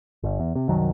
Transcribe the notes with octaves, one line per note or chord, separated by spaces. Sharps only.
G1
E2
C3
C2 F#2 D#3 F#3